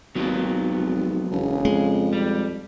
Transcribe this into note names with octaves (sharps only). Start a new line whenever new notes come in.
G#1 D#2 F#3 B3 F4
F1
E1 C#3
F2 G#3
B1 G3